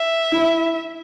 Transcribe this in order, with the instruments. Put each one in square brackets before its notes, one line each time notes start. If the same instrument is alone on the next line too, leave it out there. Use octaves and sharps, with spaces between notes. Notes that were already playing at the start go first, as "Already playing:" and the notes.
Already playing: [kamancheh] E5
[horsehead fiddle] E4